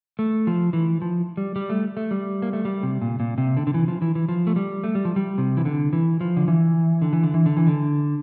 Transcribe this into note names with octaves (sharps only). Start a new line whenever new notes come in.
A3
F3
E3
F3
G3
G3
A3
A3
G3
A#3
A3
G3
C3
A#2
A#2
C3
D3
D3
E3
F3
E3
E3
F3
A3
G3
A3
G3
F3
G3
C3
E3
D3
E3
F3
D3
E3
D3
E3
D3
E3
D3
E3
D3